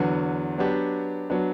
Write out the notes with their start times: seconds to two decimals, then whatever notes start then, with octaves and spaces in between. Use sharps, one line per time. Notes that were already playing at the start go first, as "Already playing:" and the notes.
Already playing: E2 D3 F#3 B3 F#4
0.58 F#3 B3 D4 G4
1.30 F#3 B3 D4